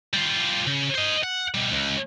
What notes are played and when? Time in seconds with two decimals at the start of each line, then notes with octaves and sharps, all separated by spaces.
0.13 G3 F4
0.67 C#3
0.95 C5 D#5
1.23 F#5
1.54 B2 G3
1.72 C#2